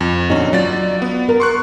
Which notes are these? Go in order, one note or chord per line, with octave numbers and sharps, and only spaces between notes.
F2
A#2 D3 C#4 D#4 F#4
F#3 F4 D5 A6
B3
A#4
C6 C#6 F#6